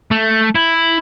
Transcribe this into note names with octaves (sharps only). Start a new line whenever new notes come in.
A3
E4